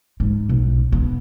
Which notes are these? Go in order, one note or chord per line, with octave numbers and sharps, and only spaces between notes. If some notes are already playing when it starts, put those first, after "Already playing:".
G#2
B1
B3